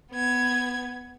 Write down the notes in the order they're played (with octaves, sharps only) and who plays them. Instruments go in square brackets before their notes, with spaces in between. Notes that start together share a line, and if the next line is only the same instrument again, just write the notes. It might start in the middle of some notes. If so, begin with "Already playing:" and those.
[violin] B3 G#6